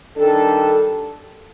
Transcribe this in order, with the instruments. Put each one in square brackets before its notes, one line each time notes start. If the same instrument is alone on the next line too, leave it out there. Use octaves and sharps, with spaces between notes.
[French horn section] D#3 G3 D4 A4